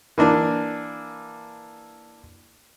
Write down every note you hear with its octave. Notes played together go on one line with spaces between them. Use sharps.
E3 A#3 D4